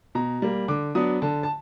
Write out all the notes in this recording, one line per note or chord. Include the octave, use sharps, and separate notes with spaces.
B2 A#5
G3 A#3
D3 D6
F#3 B3 D4 D#6
D3 A5
A5